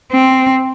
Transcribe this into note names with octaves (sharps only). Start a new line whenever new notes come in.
C4